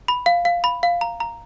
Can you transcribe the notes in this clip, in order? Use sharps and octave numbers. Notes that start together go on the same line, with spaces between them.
B5
F5
F5
B5
F5
A#5
A#5